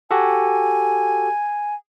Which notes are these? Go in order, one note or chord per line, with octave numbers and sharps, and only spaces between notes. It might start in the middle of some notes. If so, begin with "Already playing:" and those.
F#4 G4 A4 G#5